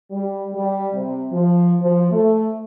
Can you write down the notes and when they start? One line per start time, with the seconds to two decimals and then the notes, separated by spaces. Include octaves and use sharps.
0.11 G3
0.54 G3
0.94 C3
1.31 F3
1.81 F3
2.11 A3